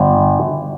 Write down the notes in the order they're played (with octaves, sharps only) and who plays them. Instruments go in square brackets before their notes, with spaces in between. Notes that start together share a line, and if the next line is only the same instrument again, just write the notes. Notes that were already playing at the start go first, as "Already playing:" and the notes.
Already playing: [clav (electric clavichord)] G1